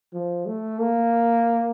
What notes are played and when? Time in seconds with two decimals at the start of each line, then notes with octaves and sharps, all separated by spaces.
0.14 F3
0.46 A3
0.79 A#3